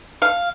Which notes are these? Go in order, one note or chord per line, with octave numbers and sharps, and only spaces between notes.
F5